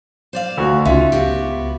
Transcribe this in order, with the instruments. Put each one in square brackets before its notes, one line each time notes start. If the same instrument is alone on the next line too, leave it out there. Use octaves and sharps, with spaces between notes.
[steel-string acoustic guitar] C5 D5 F5
[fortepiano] D2 F#4
[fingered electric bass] C#2 [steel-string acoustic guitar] C#4 D#4 [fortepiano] F4 E5
[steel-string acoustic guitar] B3 F#4 G4